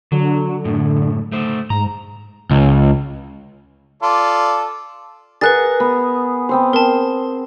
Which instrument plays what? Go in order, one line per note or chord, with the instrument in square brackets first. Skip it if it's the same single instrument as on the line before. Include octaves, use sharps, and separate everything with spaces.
[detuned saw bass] D3 [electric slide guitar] F#3
[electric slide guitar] F#2 A2
A3 C5
[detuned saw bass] G#2 [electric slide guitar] A#5
[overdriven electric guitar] C#2
[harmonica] F4 A4 D5
[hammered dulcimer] G#4 A#4 F#5 [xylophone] B4 F#6 A6
[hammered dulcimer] B3
B3 C4 C5
[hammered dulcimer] C4 [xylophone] A#4 A5